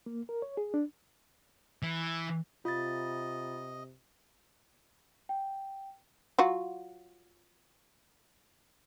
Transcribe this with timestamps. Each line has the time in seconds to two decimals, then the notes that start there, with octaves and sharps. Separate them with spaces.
0.06 A#3
0.29 A#4
0.42 C#5
0.57 G#4
0.74 D4
1.82 E3
2.65 C3 F4 D#5 A6
5.29 G5
6.39 F#3 F4 F#4